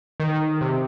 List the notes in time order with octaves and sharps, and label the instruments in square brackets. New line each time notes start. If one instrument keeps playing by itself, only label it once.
[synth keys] D#3
C3